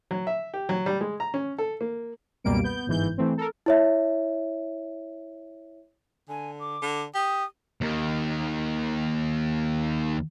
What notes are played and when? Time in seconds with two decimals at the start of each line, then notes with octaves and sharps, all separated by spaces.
0.11 F#3
0.27 E5
0.54 G4
0.69 F#3
0.86 G3
1.01 G#3
1.20 A#5
1.34 C#4
1.58 A4
1.81 A#3
2.44 C#2 F#2 B2 G3 A#3 D7
2.64 B3 G6
2.86 G1 G#2 E3 G6
3.17 E3 A3 C4
3.37 A4 A#4
3.66 E4 C#5 E5
6.29 D3 G#5
6.60 D6
6.82 D3
7.15 G4 D#6
7.81 D#2 D#3